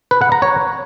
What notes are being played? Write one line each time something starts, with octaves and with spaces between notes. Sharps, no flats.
B4
F#5
A#5
C#5